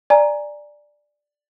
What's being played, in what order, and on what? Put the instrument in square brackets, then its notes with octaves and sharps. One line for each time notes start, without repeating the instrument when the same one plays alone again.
[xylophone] D5 G#5 A#5